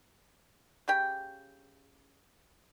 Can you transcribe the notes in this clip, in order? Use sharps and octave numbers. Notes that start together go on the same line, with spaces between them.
C#3 G4 G5